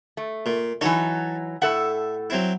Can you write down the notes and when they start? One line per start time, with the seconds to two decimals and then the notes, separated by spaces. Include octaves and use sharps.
0.17 A3
0.46 A#2
0.81 E3 F#3 D#4 A4 C#5
1.62 A2 A4 E5 F#5
2.30 F#3 C4 E4